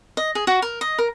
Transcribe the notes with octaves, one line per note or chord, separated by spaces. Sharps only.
D#5
G#4
F#4
A#4
D#5
A#4